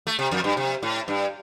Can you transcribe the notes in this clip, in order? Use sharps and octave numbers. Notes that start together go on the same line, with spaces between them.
A3
C3
F2
G2
C3
A2
G2